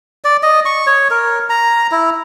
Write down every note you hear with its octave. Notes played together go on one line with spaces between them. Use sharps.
D5
D#5
C#6
C#5
A#4
A#5
E4